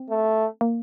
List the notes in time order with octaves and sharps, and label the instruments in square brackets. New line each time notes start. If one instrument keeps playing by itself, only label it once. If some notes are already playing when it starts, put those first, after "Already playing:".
Already playing: [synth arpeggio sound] C4
[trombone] A3
[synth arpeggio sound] A#3